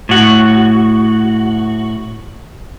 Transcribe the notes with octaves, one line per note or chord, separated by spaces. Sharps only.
A2 F#4